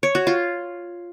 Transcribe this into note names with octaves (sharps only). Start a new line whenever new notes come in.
C#5
F#4
F4